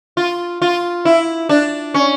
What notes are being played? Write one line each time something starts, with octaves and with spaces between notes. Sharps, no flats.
F4
F4
E4
D4
C#4